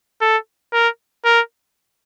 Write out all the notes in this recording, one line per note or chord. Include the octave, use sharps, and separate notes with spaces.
A4
A#4
A#4